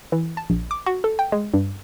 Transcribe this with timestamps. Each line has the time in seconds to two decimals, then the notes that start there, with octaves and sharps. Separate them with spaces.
0.12 E3
0.37 A5
0.50 A#1
0.71 D6
0.86 F#4
1.04 A4
1.19 G5
1.32 G#3
1.54 G2